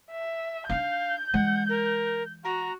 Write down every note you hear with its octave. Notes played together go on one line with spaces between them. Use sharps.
E5
D4 D#4 F5 G6
E3 G#3 F#5
A#4
F#4 A#5